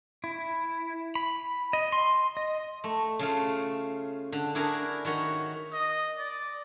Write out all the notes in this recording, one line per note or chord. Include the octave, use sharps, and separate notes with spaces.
E4
B5
D#5
C6
D#5
A3
C#3 A3 F4
D3
D4 E4 F#4 G#4 A#4
D#3 F#4 C#5 B5
D#5
D5